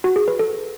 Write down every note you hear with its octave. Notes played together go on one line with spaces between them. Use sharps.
F#4
G#4
B4
A4